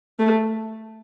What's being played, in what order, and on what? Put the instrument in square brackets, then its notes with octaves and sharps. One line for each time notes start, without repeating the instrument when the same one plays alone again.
[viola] A3